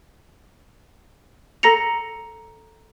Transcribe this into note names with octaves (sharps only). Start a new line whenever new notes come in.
A4 A#5 A#6 C#7 F7